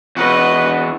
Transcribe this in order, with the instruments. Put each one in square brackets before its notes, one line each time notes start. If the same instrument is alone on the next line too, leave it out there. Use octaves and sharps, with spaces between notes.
[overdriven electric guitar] E2 F#4 [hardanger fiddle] B4 D#5